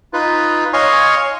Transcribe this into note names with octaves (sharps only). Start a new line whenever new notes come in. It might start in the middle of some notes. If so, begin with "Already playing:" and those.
D#4 F4 B4
C#5 D#5 F5 G#5 C6 C#6